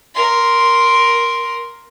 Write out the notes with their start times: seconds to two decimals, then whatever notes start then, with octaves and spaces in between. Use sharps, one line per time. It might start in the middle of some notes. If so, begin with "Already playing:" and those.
0.14 A#4 C6